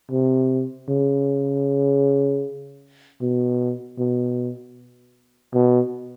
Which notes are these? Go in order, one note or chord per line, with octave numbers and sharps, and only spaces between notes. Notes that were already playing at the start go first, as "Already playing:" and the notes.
C3
C#3
B2
B2
B2